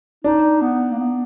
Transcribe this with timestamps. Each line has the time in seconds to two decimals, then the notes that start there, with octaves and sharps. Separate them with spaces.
0.24 D4 D#4
0.61 B3
0.91 A#3
0.99 B3